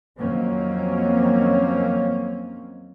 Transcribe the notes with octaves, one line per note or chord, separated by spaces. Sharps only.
F2 D#3 F#3 A#3 C4 C#4